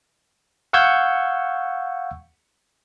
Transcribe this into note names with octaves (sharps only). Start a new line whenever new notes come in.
F5 F#5 C#6 E6 G6 G#6